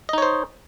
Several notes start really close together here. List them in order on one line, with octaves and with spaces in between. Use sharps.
D#5 D#4 C#5 C5